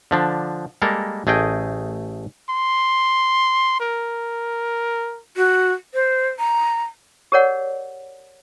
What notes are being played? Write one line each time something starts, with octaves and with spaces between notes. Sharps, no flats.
D3 F3 D4
G3 G#3 A#3 A4 A#4
A1 A3 G#4 D#5 G5
C6
A#4
F#4
C5
A#5
G4 G#4 A#4 C#5 D5 F#5